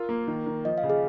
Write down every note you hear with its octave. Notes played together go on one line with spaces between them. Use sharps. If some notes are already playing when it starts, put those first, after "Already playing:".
Already playing: F4 A#4
A#3
D#3
D#3
F3 D#5
F5
C#3
G#4